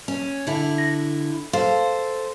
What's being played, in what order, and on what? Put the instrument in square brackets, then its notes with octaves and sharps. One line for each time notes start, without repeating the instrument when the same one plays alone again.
[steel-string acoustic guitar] C#4
D3 E4
[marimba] A#6
[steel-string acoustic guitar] A4 C5 [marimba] F5